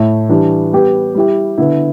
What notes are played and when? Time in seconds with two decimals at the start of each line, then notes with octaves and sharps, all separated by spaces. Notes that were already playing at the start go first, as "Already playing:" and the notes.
Already playing: A2 A3 E4
0.29 E3 G3 D4
0.72 G3 B3 G4
1.15 G3 E4 G4
1.58 D3 B3 E4